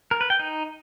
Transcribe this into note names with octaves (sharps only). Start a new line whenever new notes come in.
A#4
B4
G5
D#4